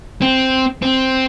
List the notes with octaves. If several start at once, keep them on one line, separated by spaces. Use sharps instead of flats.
C4
C4